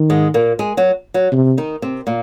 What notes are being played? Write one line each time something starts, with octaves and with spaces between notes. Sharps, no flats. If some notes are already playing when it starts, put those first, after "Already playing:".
Already playing: D#3
G#2 G#3
A#2 A#3
G#3 G#4
F#3 F#4
F#3 F#4
C3
D#3 D#4
C3 C4
A#2 A#3